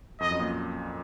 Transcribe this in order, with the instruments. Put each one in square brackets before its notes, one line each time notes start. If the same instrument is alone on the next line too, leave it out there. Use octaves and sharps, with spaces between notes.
[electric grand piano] F2 [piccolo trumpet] D#5
[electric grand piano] F#2
A#2